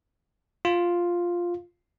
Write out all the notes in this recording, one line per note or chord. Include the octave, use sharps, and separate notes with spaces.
F4